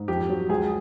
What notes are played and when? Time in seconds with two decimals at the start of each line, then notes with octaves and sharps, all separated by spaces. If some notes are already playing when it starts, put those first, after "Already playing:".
Already playing: G#2
0.08 F2 G4
0.29 F#3
0.49 C#2 G#4